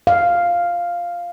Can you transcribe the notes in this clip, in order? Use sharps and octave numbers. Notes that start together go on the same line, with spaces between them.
F5